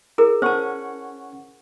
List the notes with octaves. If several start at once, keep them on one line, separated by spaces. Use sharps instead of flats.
E4 G#4 A#4
C#4 C5 F#5 A5 C#6